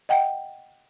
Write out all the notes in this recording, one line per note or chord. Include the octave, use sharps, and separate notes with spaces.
D#5 F#5 G5